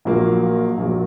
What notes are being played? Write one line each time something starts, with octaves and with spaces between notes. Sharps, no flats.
A#1 A#2 F#3 A#3
A#1 A#2 F#3 A#3